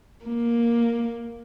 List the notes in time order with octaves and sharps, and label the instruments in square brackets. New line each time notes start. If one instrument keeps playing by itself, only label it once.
[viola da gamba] A#3